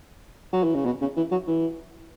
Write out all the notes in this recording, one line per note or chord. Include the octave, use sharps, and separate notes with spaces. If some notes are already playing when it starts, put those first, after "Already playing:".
F#3
E3
C#3
B2
C#3
E3
F#3
E3